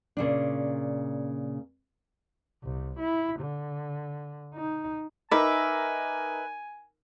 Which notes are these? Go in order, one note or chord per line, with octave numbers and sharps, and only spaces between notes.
A#2 C#3 D4
C2
E4
D3
D#4
D#4 A#4 B4 E5 G#5 D6